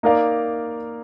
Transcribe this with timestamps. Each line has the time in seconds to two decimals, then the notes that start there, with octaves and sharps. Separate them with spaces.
0.03 A#3 D#4 A#4 D5 F5